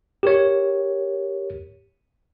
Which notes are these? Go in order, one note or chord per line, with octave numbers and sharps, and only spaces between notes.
G4 A#4 C#5